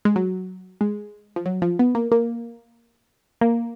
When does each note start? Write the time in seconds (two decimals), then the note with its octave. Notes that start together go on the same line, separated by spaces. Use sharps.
0.05 G#3
0.16 F#3
0.81 G#3
1.36 F3
1.46 F#3
1.62 F3
1.79 B3
1.95 A#3
2.12 A#3
3.41 A#3